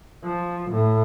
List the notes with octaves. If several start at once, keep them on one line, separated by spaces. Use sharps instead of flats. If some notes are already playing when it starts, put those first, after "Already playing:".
F3
A2